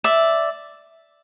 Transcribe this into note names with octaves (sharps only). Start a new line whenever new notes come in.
D5 E5